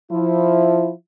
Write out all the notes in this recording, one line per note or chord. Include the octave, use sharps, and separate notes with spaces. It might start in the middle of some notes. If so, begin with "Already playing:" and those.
F3 E4